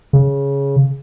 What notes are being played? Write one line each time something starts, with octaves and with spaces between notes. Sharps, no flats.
C#3